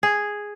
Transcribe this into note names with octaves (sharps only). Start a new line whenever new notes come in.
G#4